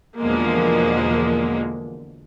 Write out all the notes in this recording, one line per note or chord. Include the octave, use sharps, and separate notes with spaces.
E2 B2 D3 F3 G#3 A#3